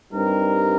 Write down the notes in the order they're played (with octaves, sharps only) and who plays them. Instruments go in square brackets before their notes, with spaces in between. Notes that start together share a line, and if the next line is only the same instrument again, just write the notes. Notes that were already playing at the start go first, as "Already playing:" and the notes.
[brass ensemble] G2 G3 C4 D#4 A#4